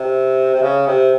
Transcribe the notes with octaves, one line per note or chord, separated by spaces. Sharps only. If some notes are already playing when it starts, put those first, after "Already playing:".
Already playing: C3
C3
C#3
C3